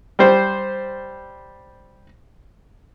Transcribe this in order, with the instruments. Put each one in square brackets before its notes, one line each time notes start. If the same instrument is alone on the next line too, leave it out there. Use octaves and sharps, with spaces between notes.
[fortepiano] G3 C5